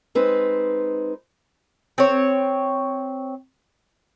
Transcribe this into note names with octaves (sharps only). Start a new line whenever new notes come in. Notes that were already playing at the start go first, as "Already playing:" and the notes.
G#3 C4 D#4 B4
C4 C#5